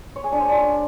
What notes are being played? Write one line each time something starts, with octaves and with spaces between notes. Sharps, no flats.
C#5
G#4
D4
C5
D4